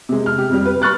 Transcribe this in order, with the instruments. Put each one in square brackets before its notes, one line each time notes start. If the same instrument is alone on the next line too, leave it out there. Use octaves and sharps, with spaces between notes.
[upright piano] C3 G#3
F6
G4
F2 G3
B4
B5 C#6 F6 F#6 A6